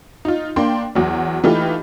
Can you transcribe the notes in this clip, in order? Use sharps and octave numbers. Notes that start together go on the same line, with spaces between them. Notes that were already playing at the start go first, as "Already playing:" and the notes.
D#4 F4
A#3 D4 G5 C6
E2 F#3
E3 A3 D#4 F4 G4 B4